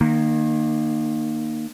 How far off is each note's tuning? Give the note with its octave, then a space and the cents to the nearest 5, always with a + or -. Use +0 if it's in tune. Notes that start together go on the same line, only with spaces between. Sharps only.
D#3 -25 A#3 +0